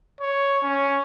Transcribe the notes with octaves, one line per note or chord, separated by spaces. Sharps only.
C#5
C#4